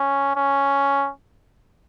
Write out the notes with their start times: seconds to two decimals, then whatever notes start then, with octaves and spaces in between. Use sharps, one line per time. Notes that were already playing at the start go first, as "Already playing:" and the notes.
Already playing: C#4
0.36 C#4